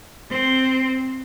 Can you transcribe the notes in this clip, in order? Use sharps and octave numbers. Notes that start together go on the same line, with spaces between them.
C4